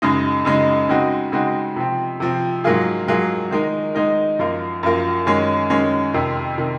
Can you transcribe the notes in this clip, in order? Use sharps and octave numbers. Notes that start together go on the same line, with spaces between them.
F#2 C#3 G#3 D#4
F#2 C#3 G#3 D#4
C#3 G#3 C4 D#4 F#4
C#3 G#3 C4 D#4 F#4
C3 F3 C4
C3 F3 C4
G#2 F#3 A#3 F4 G#4
G#2 F#3 A#3 F4 G#4
D#3 G#3 D#4 A#4
D#3 G#3 D#4 A#4
F#2 F3 A#3 F4 A#4
F#2 F3 A#3 F4 A#4
F#2 D#3 G#3 C#4
F#2 D#3 G#3 C#4
F2 C3 D#3
C3 D#3